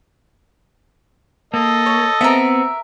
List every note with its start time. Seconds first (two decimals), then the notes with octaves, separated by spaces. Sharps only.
1.54 A#3 A4 D#5
1.86 C#5
2.21 B3 C4 A#4 E5